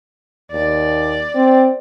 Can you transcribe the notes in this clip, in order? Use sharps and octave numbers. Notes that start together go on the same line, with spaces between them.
D#2 D5
C4